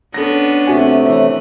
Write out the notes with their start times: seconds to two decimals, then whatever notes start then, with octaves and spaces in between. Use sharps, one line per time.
0.14 B3 C#4 D4 A4 A#6
0.67 C3 A3 C4 F#4 G#5
1.06 E3 C#5